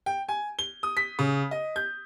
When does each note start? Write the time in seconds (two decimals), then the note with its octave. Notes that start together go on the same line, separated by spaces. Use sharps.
0.06 G5
0.29 G#5
0.59 G7
0.83 D#6
0.97 B6
1.19 C#3
1.51 D#5
1.76 G6